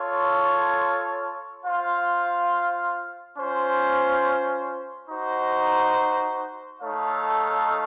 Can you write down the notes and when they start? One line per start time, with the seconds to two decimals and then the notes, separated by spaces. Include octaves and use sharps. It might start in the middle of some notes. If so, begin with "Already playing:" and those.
Already playing: F4 A4 C#5
1.65 F4 C5 F5
3.37 C#4 F4 C5
5.09 D#4 F#4 C5
6.80 A3 D#4 A4 C#5 F5